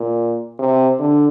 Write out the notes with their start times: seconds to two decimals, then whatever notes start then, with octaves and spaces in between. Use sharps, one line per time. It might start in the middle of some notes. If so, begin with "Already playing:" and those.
Already playing: A#2
0.59 C3
0.99 D3